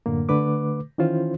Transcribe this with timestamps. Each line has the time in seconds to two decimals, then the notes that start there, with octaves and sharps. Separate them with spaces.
0.06 F#2 A2 D3 A#3
0.29 D3 A3 B4 D6
0.98 D#3 E3 C#4 E4 F4 C5